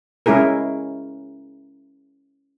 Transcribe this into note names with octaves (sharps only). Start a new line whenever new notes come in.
G#3 C#4 E4 G#4 A#4